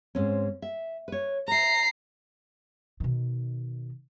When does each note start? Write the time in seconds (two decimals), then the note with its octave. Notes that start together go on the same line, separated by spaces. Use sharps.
0.15 G#2 C4 C#4
0.62 E5
1.08 B4 C#5
1.48 B4 E5 A#5 C7
3.00 B2 D#3